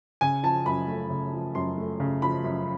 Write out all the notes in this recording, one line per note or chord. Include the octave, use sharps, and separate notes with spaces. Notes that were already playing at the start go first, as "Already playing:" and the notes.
C#3 G#5
F3 A5
F#2 B5
A3
C#3
F3
F#2 C6
A3
C#3
F3 B5
F#2